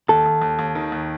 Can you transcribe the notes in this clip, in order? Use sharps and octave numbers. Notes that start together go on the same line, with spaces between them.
D#2 A4
D#2
D#2
D#2
D#3
D#2